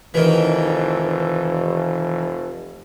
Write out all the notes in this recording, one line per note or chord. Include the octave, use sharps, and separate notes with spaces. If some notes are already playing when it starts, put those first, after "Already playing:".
F1 D#3 E3